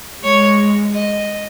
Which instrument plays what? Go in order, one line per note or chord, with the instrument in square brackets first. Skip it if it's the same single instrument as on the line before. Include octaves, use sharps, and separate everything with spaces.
[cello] G#3 [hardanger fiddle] C#5
[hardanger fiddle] D#5